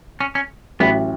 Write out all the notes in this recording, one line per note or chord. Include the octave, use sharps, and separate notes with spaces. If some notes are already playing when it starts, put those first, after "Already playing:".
C#4
C#4
A1 A2 F#3 B3